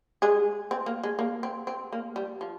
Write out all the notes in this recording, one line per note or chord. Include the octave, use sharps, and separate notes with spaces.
G#3 G#4
C4
A#3
G#3
A#3
C4
C4
A#3
G3
F3